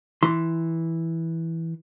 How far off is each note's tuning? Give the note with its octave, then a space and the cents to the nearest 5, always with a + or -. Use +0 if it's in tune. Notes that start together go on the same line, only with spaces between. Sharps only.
E3 -5 C6 -10